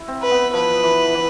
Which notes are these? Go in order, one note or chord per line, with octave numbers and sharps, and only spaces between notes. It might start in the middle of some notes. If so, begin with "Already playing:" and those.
Already playing: E4
C4
B4
B3
F3 B4
E3
E3